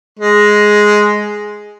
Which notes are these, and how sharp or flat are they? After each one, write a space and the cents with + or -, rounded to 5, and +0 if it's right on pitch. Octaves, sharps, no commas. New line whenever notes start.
G#3 +5